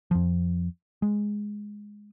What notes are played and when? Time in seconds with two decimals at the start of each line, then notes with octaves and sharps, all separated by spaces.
0.11 F2 F3
1.02 G#3